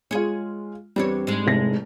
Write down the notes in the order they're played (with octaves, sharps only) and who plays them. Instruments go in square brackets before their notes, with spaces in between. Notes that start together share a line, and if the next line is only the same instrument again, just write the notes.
[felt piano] G#3 F4 [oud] G#4 C#5
[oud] E2 D4 C#5 [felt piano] G3 C4
[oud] G#2 G#3
[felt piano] F1 C2 A#6